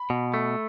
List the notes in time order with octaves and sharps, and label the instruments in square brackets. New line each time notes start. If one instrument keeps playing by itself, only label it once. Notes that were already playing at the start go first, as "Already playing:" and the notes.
Already playing: [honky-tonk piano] B5
[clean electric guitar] B2
A3